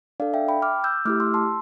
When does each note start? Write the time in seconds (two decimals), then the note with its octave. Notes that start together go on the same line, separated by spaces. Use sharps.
0.20 D4 A4 D5 F5
0.34 E5 G5
0.49 G5 B5
0.62 D6 F6
0.84 E6 G6
1.05 A3 E4 G4 D6 F6
1.20 C6 E6
1.34 A5 C6